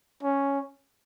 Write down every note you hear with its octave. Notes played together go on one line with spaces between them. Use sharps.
C#4